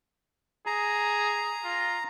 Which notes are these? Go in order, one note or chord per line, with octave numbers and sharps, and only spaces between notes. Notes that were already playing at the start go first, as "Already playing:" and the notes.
G#4 A#5
F4